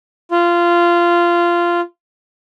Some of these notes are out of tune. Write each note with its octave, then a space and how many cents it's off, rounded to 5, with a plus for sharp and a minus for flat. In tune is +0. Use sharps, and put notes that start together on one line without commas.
F4 -15